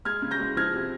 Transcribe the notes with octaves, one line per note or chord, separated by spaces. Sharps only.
G#3 F6 G#6
C#3
G6 A#6
G#3
F3 F6 G#6
C3